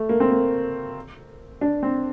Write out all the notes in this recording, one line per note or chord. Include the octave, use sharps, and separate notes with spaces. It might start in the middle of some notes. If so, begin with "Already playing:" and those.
Already playing: A3
A#3
C4
A#3
D4
C4